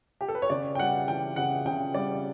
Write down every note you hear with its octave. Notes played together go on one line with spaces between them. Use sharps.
G4
A4
B4
C#5
C#3 D5
G5
G3 F#5
E3 G5
C#3 F#5
C#3 G5
G3 D5